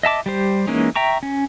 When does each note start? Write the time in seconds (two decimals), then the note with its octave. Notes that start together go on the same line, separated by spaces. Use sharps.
0.03 D#5 E5 A5 D6
0.26 G3 G4 C5
0.67 E3 G#3 A#3 C#4 D#4
0.96 E5 G5 A#5 C#6
1.23 C#4